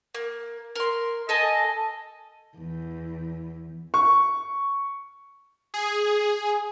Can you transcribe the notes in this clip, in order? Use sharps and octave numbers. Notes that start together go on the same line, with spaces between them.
A#3
A#4 C6
A4 D#5 G#5 A5
E2
C#6
G#4